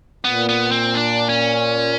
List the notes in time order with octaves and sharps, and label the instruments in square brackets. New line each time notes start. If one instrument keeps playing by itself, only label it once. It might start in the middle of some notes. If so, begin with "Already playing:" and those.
[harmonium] A#2 [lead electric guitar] B3
[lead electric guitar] B3
C4
D4
C#4